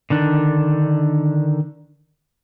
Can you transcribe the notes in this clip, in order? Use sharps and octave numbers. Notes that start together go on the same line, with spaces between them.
D3 D#3 D4